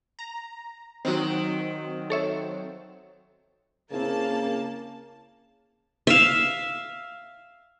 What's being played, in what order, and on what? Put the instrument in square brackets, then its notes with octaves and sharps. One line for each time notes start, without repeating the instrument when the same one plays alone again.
[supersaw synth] A#5
[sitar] D#3 [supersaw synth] F#3 C4
[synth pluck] A4 C#5 E5
[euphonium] C#3 [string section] A#3 A5 [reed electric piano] C4 E4 A#4
[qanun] E5 F5